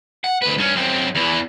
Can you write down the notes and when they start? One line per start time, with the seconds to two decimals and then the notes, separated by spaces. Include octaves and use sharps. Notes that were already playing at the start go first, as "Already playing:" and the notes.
0.24 F#5
0.42 D2 B4
0.58 G2 C#4
0.75 F#2 C4
1.15 E2 E3